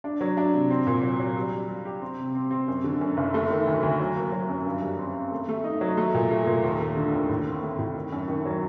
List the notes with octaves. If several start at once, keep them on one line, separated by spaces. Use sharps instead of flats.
D4
F#3
D4
C3
C4
A#2
F#3
F#3
G3
G3
G3
G4
C4
C3
C4
C4
F#2
D3
F#2
F#1
A3
D#3
D2
D2
F#3
A#3
F#3
F#2
G2
G3
C4
C4
A3
A3
D#4
F#3
A3
A#2
A3
A#2
D#2
A3
D3
D#2
A2
C4
A3
A2
D#3
F#2
D#3
F#3